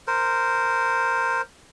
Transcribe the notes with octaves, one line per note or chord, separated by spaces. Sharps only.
A#4 C5